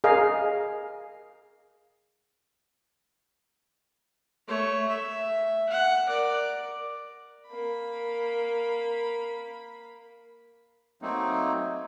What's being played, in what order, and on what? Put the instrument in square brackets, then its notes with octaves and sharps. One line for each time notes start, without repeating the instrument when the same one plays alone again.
[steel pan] G#4 A#4 D#5 F5
[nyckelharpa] A3 C#5
E5
F#5
A#4 D5
[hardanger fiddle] A#3 B5
[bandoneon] F#3 A3 A#3 C4 D#4